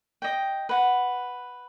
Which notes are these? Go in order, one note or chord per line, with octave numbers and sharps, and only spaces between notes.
D#5 G5
B4 F#5